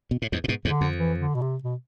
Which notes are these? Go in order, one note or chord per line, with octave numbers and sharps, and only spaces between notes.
B2
A2
E2 G#2
A2
G#2 B2
E2 G#2 D3
F2
E3
D3
B2
C3
B2